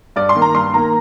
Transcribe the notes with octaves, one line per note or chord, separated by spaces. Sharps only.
G2 D5
C6
D#3 A#3
A#5
G2 C6
D#3 A#3 A#5